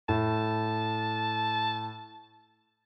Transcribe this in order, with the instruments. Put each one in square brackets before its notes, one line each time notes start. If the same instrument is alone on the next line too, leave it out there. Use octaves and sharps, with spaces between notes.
[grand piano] A2 [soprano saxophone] A5